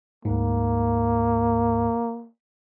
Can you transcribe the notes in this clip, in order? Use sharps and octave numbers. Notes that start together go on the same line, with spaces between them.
D2 G#2 A#3